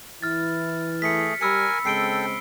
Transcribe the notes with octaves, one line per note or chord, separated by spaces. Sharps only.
E3 E4 F6 A6
A3 G#4 B6 C#7
G3 A#4 G#5 B5 E6 C#7
C#3 G#3 C4 A4 G5 C7 D7 G7